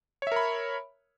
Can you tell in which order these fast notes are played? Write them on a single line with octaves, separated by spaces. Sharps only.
C#5 E5 A#4 B5